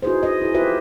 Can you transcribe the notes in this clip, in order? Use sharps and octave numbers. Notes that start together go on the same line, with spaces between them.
D#4 E4 F#4 G#4 B4 C5
D#4 D#5
E4 G#4
F4 G4 B4 C5 E5